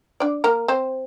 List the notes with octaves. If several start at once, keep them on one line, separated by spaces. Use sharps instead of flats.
D4 D5
A#3 A#4
C4 C5